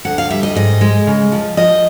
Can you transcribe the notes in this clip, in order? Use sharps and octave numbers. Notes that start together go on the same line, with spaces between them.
D2 F#5
F5
G3 E5
D#5
G#2 D#5
G#3
C#3
F3
F3 D#5